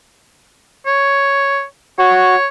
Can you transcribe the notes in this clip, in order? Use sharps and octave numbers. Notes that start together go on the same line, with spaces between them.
C#5
F#4 C#5